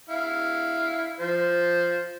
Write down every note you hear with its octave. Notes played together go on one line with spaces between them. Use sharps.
E4 F5
F3 C5